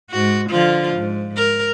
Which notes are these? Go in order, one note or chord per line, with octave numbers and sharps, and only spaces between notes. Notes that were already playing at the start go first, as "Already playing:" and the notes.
G#2 F#4
D3 F3 F4
G#2
A#4